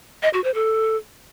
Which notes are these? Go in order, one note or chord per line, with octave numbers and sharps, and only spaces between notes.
D#5
F#4
C5
A4